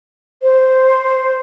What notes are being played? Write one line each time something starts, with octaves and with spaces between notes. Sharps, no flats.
C5